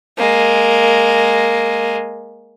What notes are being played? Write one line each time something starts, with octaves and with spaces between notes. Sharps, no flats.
G#3 A#3